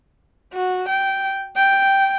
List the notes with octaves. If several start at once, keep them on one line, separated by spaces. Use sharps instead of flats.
F#4
G5
G5